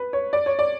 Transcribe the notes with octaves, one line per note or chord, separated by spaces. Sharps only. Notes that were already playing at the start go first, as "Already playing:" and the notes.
Already playing: B4
C#5
D5
C#5
D5